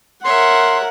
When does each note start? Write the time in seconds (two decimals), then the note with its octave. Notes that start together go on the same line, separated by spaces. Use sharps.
0.24 A#4 C#5 E5 F#5 C6